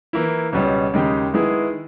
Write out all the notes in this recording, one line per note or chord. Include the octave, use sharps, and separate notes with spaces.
E3 A#3 E4
C#2 B2 G3 C#4
D#2 C#3 G#3 D#4 G4
D#3 G#3 B3 E4 G#4